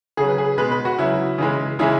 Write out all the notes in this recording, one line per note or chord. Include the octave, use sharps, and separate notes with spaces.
C#3 F#3 G#4
B4
G#4
B2 G#3 B4
B4
F#4
C#3 F#3 E4
C#3 E3 G#3
C#3 E3 G#3 E4